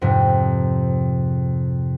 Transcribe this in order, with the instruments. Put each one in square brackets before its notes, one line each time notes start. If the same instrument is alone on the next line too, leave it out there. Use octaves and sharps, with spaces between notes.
[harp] F2 G#2 C3